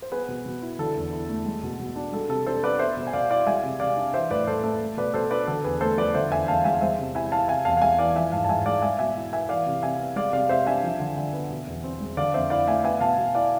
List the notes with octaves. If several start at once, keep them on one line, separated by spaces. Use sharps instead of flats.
C5
B3 G#4 B4
B2
B2
E4
D3 A4
E2
E4
A3
G#3
B2
B2
D4
G#3 A4
C3 A4
D4 A4 C5
B3 B4 D5
B3 C5 E5
B2
G#5
B2 D5 F5
E4 D5 F5
G#3 E5 G#5
C3
C3 D5 F5
D4
E3 C5 E5
A2 B4 D5
A2 A4 C5
A3 A4 C5
A3
B2 B4 D5
B2 A4 C5
D4 B4 D5
D3 A4
E2 G#4 B4
A3 A4 C5
F3 B4 D5
D3 C5 E5
E2 E5 G#5
E2 F5 A5
G#3 E5 G#5
G#3 C5 E5
C3
E4 E5 G#5
C4 F5 A5
C3 E5 G#5
E2 F5 A5
F5
G#3 E5 G#5
E3 D5 F5
F3 E5 G#5
G#2 F5 A5
A5
G#2 E5 G#5
G#3 D5 F5
G#3 E5 G#5
B2 E5 G#5
E4
B3 E5 G#5
E3 D5 F5
C3
C3 E5 G#5
B3
G#3 D5 F5
C3 D5 F5
C3 C5 E5
D4 E5 G#5
F3
D3
D3
B3
B2
E2
C4
G#3
D3 D5 F5
F2 C5 E5
E4 D5 F5
A3 E5 G#5
B3 E5 G#5
B2 F5 A5
B2
E4 D5 F5